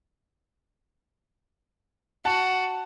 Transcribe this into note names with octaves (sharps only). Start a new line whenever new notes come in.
F#4 F#5 A5